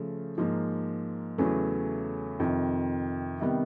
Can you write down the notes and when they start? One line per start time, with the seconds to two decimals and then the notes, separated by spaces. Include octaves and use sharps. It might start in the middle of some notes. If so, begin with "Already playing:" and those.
Already playing: C#3 F3 A3
0.38 G#2 F3 A#3
1.38 E2 C#3 F#3 A3 C#4
2.40 F2 C3 D#3
3.40 C3 D#3 G3 B3